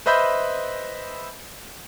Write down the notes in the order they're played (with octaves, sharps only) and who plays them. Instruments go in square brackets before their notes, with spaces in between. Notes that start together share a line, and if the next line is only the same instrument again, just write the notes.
[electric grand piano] B4 C5 D#5 E5 B5 G6